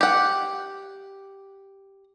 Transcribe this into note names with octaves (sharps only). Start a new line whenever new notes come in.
G4 F#5